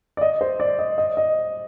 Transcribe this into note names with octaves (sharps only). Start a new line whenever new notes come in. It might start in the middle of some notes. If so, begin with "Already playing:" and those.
D5
D#5
C5
D5
D#5
D#5
D#5